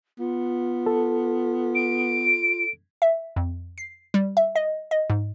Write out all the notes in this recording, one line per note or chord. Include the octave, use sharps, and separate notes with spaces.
B3 F4
A4
D7
E5
F2
C7
G3
E5
D#5
D#5
G#2